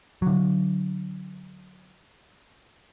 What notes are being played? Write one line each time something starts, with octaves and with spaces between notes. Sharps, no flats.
D3 F#3